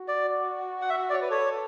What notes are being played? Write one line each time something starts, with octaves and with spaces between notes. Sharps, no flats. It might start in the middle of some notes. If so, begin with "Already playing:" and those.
Already playing: F#4
D5
F#5
E5
D5
C#5
B4
A4 C#5